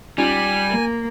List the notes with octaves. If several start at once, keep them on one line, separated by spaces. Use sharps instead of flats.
G3 C#4 D#4 F4 G#5
A#3